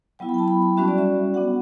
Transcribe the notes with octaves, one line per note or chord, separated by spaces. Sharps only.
F#3 B3 E4 G5
B5
G5
A5
B5
B5
G3 C#4 F#4 E5
D5
E5
B3 D4 F#4 F#5